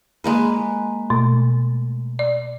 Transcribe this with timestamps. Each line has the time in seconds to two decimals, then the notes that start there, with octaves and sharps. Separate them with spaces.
0.24 G#3 A#3 B4
1.10 B2 A3
2.19 D5